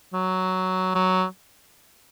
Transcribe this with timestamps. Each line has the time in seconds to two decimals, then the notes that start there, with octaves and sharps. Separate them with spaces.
0.13 F#3
0.95 F#3